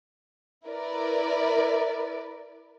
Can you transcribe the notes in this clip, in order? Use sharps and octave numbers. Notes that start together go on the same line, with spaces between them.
E4 A#4 B4 D5